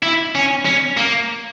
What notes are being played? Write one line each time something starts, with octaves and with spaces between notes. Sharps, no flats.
E4
C#4
C#4
A#3